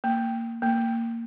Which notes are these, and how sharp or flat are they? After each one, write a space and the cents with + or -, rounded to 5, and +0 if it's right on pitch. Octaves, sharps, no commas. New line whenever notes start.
A#3 -15
A#3 -15